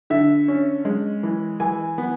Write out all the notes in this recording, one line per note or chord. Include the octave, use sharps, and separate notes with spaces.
D3 E5
C#4
G#3
E3
E3 G#5
B3